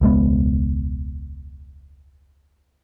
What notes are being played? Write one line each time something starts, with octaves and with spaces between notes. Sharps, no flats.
E1 C#2 G#3 B3